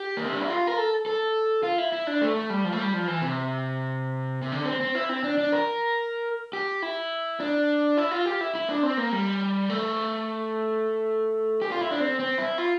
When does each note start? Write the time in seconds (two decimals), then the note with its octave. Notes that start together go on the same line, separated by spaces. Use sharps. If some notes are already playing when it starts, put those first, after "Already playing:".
Already playing: G4
0.17 A#3
0.25 C4
0.33 D4
0.40 E4
0.49 F4
0.67 A#4
0.77 A4
1.06 A4
1.63 F4
1.78 E4
1.92 E4
2.07 D4
2.21 A3
2.36 A3
2.50 G3
2.64 F3
2.73 A3
2.79 G3
2.93 F3
3.07 E3
3.22 C3
4.42 C3
4.52 D3
4.66 C4
4.80 C4
4.95 E4
5.09 C4
5.24 D4
5.38 D4
5.52 A#4
6.53 G4
6.82 E4
7.40 D4
7.97 E4
8.11 F4
8.26 G4
8.41 E4
8.55 E4
8.69 D4
8.83 C4
8.97 A#3
9.12 G3
9.70 A3
11.62 G4
11.72 F4
11.81 E4
11.91 D4
12.00 C4
12.20 C4
12.38 E4
12.58 F4